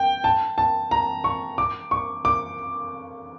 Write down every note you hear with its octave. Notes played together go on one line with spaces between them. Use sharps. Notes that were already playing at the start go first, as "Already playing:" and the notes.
Already playing: G5
A5
A5
A#5
C#6
D6
C#6
D6